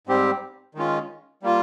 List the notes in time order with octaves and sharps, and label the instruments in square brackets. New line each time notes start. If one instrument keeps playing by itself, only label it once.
[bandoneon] G#2 G3 C4 G4
D#3 G#3 C#4 F4
G3 A#3 F4